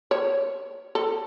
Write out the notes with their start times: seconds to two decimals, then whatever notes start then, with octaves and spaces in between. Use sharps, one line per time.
0.11 C#5
0.95 A4